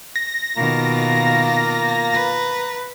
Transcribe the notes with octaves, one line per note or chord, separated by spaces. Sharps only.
A#6
B2 D#3 A#3 F4 A#5
B4